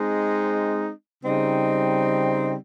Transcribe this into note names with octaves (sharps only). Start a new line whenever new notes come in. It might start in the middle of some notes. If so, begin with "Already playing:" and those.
Already playing: G#3 C4 D#4
C#3 G3 C4 D#4